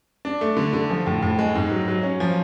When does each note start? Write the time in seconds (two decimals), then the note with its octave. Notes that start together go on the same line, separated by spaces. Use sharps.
0.25 D4
0.41 A3
0.57 D3
0.73 D3
0.90 F3
1.06 A2
1.22 A2
1.39 G#3
1.55 G#2
1.72 F#3
1.88 F#3
2.03 C#4
2.20 F3